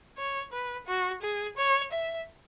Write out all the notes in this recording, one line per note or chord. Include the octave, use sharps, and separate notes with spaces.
C#5
B4
F#4
G#4
C#5
E5